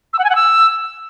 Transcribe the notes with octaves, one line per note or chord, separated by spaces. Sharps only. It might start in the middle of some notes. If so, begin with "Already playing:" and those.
E6
F#5
G#5
F#5
E6